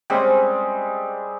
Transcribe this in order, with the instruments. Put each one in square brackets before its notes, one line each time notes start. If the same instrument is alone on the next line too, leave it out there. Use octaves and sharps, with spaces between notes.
[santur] G3 G#3 C4 C#4